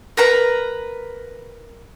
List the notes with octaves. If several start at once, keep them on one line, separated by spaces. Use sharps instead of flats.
A#4 B4 A#5